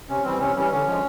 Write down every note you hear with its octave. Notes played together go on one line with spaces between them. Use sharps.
C3 C#4
E3 G3 C4
C3 C#4
E3 G3 C#4
D3 C#4
F3 G#3